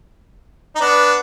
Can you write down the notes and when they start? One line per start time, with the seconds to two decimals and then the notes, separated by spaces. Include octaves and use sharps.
0.75 D#4
0.80 B3 D4